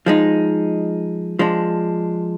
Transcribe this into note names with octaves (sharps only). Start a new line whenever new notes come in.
F3 G#3 D#4
F3 G#3 D4